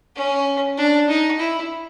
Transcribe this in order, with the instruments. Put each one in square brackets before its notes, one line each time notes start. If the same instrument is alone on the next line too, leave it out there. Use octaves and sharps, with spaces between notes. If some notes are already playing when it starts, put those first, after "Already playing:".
[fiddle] C#4
D4
D#4
E4